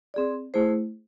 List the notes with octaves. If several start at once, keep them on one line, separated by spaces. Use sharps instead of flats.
C4 G#4 D5
A3 E4 G#4 C5